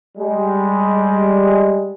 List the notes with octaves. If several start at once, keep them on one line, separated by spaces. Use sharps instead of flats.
G3 G#3